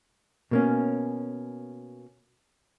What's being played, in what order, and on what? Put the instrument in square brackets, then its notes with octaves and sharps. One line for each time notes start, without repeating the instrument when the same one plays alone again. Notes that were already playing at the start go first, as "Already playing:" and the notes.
[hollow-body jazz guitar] B2 A#3 C#4